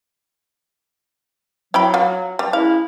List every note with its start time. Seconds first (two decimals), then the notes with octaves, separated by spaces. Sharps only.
1.74 F#3 E4 G5 B5
1.94 F4 F#4
2.39 G3
2.53 G#3 C#4 E4 F5